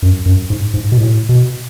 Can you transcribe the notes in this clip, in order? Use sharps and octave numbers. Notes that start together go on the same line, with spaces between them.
F#2
F#2
G#2
G#2
B2
A2
B2